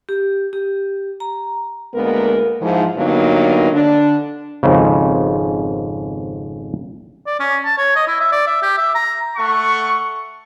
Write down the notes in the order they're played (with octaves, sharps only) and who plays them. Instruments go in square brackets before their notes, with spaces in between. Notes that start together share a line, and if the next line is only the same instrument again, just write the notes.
[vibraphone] G4
G4
A#5
[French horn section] D2 G#3 A#3 B3 A#4
G#2 E3 F3
G2 D3 F#3 A#3 B3 D#4
D3 D4
[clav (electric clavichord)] G#1 F2 G#2 C#3
[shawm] D5
C#4
A5
C#5
D#5
E4
E5
D5
E5
G4
E5
A#5
[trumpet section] A3 F#5 C#6